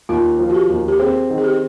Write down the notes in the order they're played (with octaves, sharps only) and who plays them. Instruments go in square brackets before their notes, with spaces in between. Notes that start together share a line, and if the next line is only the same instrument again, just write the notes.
[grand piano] D#2 [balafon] F4
[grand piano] F3
[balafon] F#4
G4
[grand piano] D#2
[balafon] G4
[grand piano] C4 [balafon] G#4
[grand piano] D#3
[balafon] G#4
G4